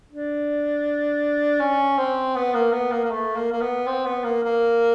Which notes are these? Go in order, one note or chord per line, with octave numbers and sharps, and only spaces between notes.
D4
C#4
C4
B3
A#3
B3
A#3
A#3
A3
A#3
A#3
B3
C4
B3
A#3
A#3